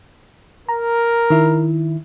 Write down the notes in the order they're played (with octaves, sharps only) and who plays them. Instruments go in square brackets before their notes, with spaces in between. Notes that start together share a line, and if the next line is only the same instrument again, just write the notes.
[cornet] A#4 [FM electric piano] A#5
[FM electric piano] D#3 E4